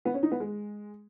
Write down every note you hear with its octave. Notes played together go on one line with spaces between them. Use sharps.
B3
C#4
D#4
B3
G#3